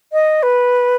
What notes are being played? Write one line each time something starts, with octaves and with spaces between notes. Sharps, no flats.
D#5
B4